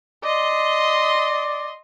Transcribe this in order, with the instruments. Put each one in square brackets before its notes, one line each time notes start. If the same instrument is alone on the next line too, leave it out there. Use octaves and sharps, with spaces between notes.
[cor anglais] D5 [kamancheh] D#5 C6